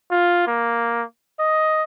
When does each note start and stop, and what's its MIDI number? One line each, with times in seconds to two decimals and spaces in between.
0.11 0.44 65
0.47 1.04 58
1.40 1.84 75